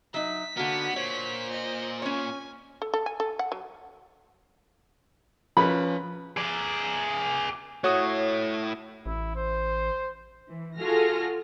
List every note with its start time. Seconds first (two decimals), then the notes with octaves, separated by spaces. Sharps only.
0.14 F#3 D#4 E5 B6
0.57 D3 A#3 B3 F#4
0.96 A#2 C5 C#5
1.51 D#5
2.02 C#4 C#5 G#5
2.82 A4
2.94 A4
3.06 G#5
3.20 A4
3.39 F#5
3.52 F#3
5.57 F3 C#4 B4 B5
6.37 G#4 D5
7.84 A3 E4 F#4 C#5 D#6
9.06 A1 E4
9.36 C5
10.48 E3
10.79 F4 F#4 G#4 A4 F6 A#6